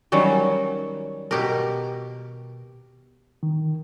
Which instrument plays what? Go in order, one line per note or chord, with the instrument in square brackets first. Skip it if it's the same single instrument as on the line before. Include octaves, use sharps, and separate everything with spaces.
[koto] D#3 F#3 G3 C#4
B2 G4 A#4
[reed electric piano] D#3